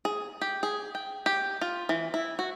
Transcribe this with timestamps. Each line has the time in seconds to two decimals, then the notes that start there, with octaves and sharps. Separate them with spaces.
0.05 G#4
0.41 G4
0.63 G#4
0.95 G5
1.26 G4
1.61 F4
1.89 E3
2.14 E4
2.39 F#4